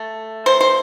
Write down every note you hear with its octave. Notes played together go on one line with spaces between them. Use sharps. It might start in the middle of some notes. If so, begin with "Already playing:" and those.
Already playing: A3
C5
C5